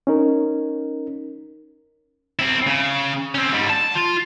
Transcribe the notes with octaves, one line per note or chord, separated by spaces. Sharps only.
C#4 D#4 A#4
C4 E4
C#3
C4 C#4
G#2 G3
A5
F4